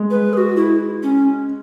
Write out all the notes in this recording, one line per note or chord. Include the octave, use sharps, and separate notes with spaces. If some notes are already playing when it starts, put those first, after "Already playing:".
Already playing: G#3
B4
G#4
F#4
E4
C#4